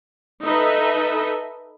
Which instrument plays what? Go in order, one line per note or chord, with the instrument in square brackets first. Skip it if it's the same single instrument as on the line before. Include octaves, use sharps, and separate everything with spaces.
[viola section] D#4 A4 B4 D#5 E5